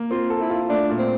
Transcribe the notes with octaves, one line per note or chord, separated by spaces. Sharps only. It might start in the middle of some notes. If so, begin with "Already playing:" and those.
Already playing: A#3
C4 F4
A4
E4
F4
A3 D4
A#2
C4